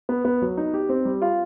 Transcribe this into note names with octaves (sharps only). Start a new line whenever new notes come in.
B3
B3
F#3
D#4
G4
C4
G3
F4